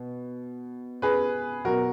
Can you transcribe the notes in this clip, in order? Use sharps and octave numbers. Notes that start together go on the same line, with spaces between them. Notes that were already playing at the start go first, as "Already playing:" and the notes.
Already playing: B2
G#4 B4
B2 F#3 F#4 A#4